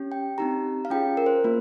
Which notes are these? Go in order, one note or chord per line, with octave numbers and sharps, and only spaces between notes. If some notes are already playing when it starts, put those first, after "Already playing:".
Already playing: C#4 G4
G5
C4 D#4 G4 A#5
F5
C#4 F4 G#4 G5
A#4
C5
A#3 F4